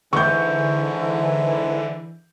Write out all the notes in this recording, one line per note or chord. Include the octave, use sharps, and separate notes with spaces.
G#2 D3 E3 C#6 G6